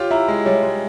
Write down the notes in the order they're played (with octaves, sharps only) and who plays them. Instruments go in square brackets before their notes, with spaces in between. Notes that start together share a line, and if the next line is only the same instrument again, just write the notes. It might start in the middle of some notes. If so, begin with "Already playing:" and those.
Already playing: [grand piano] F4 G4 [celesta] C#5
[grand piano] E4 [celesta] E5 A#5
[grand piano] G#3
[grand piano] G3 [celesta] C#5
[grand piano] G#3